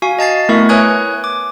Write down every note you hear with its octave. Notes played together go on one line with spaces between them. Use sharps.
F#4 F5 G#5
D#5 A5 A6 C7
A3 B3 E4 A#4 E5 C#6
B4 C#5 G#5 D#6 F#6 G#6
D6